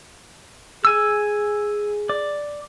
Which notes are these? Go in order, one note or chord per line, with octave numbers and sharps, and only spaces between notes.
G#4 G#5 E6
D5